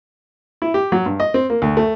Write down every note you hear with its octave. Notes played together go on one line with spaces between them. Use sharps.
E4
G4
F#3
G2
D#5
C4
A#3
D2
A3